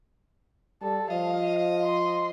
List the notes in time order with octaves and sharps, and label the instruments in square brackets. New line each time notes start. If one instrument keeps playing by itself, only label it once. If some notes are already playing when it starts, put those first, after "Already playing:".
[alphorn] G3 [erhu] A4
[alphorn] F3 [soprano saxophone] D#5 [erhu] F5
[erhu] C6